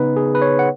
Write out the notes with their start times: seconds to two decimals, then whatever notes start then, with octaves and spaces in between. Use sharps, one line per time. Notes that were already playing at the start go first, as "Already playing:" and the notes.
Already playing: C#3 B3 D#4 B4
0.17 G#4
0.35 B4
0.42 C#5
0.59 F#5